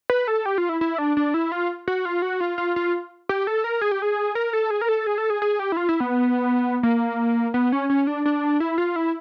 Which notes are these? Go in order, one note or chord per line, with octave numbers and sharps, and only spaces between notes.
B4
A4
G4
F4
E4
E4
D4
D4
E4
F4
F#4
F4
F#4
F4
F4
F4
G4
A4
A#4
G#4
G4
G#4
A#4
A4
G#4
A#4
A4
G#4
A4
G#4
G#4
G4
E4
F4
E4
B3
A#3
B3
C#4
C#4
D4
D4
E4
F4
E4